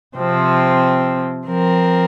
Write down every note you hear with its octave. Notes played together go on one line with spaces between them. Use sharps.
C3 F3 C4
F3 C4 A#4